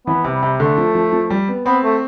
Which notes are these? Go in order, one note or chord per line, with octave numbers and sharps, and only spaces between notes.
E3 B3
C3
G3
C3
D3 A3
F3
F3
F3
G3
B3
B3 C4
A3